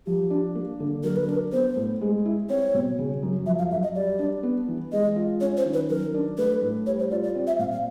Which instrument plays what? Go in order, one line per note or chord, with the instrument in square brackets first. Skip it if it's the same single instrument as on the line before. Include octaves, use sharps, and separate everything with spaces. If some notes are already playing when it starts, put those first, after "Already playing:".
[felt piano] F3 [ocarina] G4
[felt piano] D4
A#3
D3
[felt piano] F#3 [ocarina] A#4
[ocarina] B4
[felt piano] D4 [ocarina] A#4
[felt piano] B3 [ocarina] C5
[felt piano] A2
G#3
E4
[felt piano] C4 [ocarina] C#5
[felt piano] B2
C#3
F#2
[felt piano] F3 [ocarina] E5
[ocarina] F5
[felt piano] F#2 [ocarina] E5
[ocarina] D#5
[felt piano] G3 [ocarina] D5
[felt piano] D4
B3
E3
[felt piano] G#3 [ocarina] D#5
[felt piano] F4
[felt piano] C#4 [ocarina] C#5
[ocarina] C5
[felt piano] D#3
[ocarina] B4
[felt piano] F#3 [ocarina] A#4
[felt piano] D4
[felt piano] A3 [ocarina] B4
[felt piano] A2
[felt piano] G3 [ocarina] C#5
[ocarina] C5
[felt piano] F4 [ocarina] D5
[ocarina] D5
[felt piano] C4
[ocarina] E5
[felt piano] A#2 [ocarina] F5
[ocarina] F5